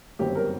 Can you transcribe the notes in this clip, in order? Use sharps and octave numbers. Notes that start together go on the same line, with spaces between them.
G1 F#2 D#3 F#3 C4 G4
A#4